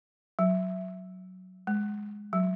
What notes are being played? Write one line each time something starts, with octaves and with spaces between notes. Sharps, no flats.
F#3
G#3
F#3